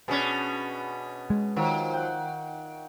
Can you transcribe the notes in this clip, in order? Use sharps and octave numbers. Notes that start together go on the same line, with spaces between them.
B2 C#4 D4 G#4
G#3
D#3 F3 F#3
F#5 G5